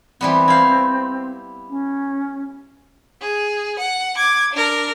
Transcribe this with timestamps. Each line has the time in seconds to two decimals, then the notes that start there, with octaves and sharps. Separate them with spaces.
0.21 E3 G3 B3 C4
0.48 E4 F5
1.70 C#4
3.21 G#4
3.79 F#5
4.17 D6 G#6
4.53 D4 A#4